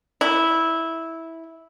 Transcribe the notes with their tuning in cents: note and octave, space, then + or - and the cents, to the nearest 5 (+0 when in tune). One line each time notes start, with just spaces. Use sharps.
E4 -10